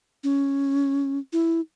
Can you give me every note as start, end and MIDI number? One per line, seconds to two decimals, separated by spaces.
0.24 1.19 61
1.33 1.60 64